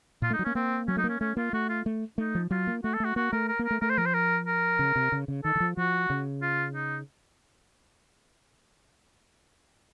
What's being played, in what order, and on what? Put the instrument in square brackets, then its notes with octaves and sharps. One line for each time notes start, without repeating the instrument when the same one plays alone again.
[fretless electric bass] A#2 [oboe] F4
[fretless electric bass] A3 [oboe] D#4
[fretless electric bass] F#3
[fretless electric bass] A#3 [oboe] C#4
[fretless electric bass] A#3 [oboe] C4
[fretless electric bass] F#3 [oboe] C#4
[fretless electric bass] A3 [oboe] D#4
[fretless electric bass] A#3
[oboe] C#4
[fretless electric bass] A3 [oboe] C#4
[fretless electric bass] A#3 [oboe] F4
[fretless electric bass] A3 [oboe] F#4
[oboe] F4
[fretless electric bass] A3
[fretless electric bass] A3 [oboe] D#4
[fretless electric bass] F3
[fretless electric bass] F#3 [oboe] F4
[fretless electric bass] A#3
[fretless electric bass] A3 [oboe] F#4
[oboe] A4
[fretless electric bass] A3 [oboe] F#4
[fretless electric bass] A#3 [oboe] F#4
[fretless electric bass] A3 [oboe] A#4
[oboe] A#4
[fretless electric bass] A#3
[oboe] A#4
[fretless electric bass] A3
[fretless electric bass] A3 [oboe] A#4
[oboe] C5
[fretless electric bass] F3 [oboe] A#4
[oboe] C5
A#4
A#4
[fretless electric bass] C#3
C3
C#3
C#3
[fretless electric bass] D#3 [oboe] A4
[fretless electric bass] D#3
F3
[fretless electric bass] F3 [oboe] F#4
[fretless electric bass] C#3
[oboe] F4
D#4